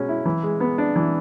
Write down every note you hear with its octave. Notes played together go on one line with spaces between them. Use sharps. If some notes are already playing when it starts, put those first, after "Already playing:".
Already playing: B2 G#3 C#4
E4
E3
G#3
B3
D4
E3